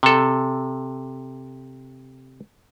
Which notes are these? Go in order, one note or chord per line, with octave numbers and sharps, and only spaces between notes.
C3 A4